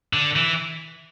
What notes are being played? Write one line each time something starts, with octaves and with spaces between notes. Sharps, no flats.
D3
E3